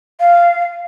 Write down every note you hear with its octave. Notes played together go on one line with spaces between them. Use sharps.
F5